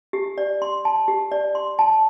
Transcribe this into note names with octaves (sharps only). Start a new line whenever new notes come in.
G4
D5
C6
A5
G4
D5
C6
A5